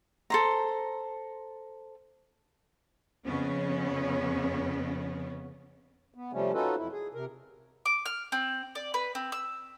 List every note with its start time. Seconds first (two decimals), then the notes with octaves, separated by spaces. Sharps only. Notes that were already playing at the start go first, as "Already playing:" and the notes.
0.30 A4 C5 A#5
3.24 F2 C#3 B3 C#4
6.14 B3
6.33 C3 F3 G3 A3 C#4
6.54 C#4 D#4 F4 F#4 A4 B4
6.78 F2 E4
6.92 G#4
7.15 C3 A#4
7.86 D6
8.06 F6
8.32 C4
8.75 D5
8.94 B4
9.15 C4
9.32 E6